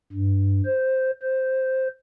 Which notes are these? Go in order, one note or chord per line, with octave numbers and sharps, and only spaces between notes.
G2
C5
C5